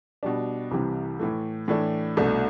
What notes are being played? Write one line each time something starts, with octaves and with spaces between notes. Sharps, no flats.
B2 G3 D4
C2 C3 E3 G3 C4
A2 E3 A3
A2 E3 A3 D4
C2 B2 A3 D4